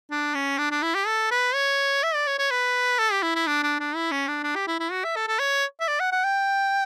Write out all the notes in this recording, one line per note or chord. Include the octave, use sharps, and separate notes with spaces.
D4
C#4
D4
D4
E4
G4
A4
B4
C#5
E5
D5
C#5
C#5
B4
A4
G4
E4
E4
D4
D4
D4
E4
C#4
D4
D4
G4
E4
E4
F#4
E5
A4
A4
C#5
E5
D5
F#5
F#5
G5